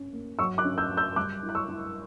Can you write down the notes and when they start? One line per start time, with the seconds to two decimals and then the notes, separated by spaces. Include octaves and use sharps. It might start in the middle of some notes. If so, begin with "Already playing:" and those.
Already playing: C#4
0.13 A#3
0.39 F#3 C#6 E6
0.58 D6 F#6
0.65 C#4
0.78 E6 G6
0.90 F#3
0.97 E6 G6
1.16 G3 D6 F#6
1.43 E4
1.49 F#6
1.55 C#6 E6
1.68 E4